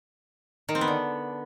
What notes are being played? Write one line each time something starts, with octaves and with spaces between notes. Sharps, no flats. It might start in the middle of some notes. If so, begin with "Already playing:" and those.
D#3
C4
B3
D3